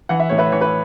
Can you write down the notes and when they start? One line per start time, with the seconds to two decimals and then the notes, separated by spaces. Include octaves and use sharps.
0.09 E3 F#5
0.20 E5
0.29 A2 C#5
0.38 B4 E5
0.52 E3 C#5
0.61 B4